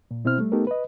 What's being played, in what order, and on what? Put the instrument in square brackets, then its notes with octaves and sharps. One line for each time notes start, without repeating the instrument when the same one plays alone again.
[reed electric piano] A#2
B2 C4 E4 C5 F6
G3 A3
A3 B3 D#4 G4 A4 A#4
B4 D#5